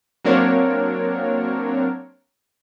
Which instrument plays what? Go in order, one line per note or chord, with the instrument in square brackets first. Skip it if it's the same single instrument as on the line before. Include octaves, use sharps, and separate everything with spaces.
[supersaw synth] F#3 A#3 C4 D4 A#4 C#5